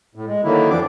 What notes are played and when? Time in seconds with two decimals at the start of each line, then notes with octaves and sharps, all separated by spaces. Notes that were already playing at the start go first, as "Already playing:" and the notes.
0.15 A2
0.27 G#3
0.44 D3 D#3 F#3 A#3 E4
0.70 F2 E3 F3 D4 D6